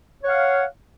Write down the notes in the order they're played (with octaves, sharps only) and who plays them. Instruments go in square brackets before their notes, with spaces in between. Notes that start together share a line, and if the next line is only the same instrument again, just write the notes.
[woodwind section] C#5
F#5
F5